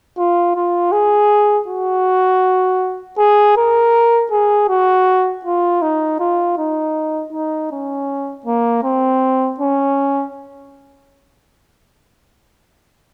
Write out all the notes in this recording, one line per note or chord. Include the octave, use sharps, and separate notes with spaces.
F4
F4
G#4
F#4
G#4
A#4
G#4
F#4
F4
D#4
F4
D#4
D#4
C#4
A#3
C4
C#4